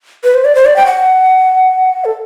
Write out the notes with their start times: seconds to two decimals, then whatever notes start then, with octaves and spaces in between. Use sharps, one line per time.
0.24 B4
0.35 C5
0.45 D5
0.55 C5
0.65 D5
0.76 G5
0.86 F#5
2.05 A4